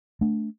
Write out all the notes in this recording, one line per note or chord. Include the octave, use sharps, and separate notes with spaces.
A3 D4